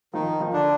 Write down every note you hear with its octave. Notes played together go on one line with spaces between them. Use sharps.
D#3 F3 D#4
F3
D3 D4